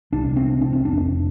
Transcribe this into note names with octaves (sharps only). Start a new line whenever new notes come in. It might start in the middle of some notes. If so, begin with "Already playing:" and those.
C2 C3 D4
C4
D4
C4
F1 F2 C3 D4